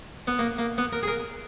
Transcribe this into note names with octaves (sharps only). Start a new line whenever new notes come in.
B3
A#3
A#3
B3
A#4
G#4
A#4